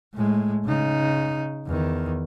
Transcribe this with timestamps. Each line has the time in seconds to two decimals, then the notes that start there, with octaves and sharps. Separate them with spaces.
0.15 A2 G#3
0.65 C#3 D#4
1.66 E2 D#3